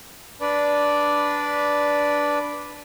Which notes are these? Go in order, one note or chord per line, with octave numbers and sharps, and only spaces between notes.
D4 B4 D5